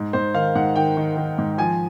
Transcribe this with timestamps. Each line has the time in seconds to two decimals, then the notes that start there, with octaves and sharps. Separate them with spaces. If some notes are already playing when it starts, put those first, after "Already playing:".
Already playing: G#2
0.13 G#2 C5
0.34 D#3 F5
0.55 G#2 F#5
0.76 D#3 G5
0.97 D#3
1.17 D#3
1.38 G#2
1.58 F3 G#5